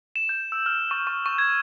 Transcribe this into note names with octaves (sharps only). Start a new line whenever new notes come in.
E7
G6
E6
F6
C#6
C#6
C#6
G#6